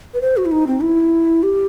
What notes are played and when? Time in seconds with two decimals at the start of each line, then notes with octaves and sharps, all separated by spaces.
0.14 B4
0.21 C5
0.37 F#4
0.45 E4
0.52 D#4
0.67 C4
0.82 E4
1.43 G4